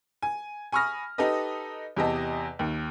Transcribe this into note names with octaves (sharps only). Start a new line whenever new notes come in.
G#5
G#5 B5 C#6 D#6 F6 A#6
D#4 G4 A4 B4 D#5
E2 C3 G4 D#5 A5
D#2